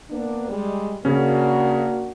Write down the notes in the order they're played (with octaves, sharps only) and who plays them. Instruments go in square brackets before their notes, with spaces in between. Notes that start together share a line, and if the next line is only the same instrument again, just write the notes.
[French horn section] A#3 B3 D4
G3 G#3
[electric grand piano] C#3 C#4 [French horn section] A#3 D4 F#4